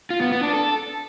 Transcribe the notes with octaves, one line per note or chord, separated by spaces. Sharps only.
F4
B3
B3
D4
A4